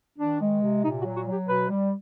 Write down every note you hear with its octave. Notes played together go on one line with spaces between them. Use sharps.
D#3 D4
G#3
C3
A#2 D#4
F#4
F#3
F#4
F#3
G4
B2 B4
G3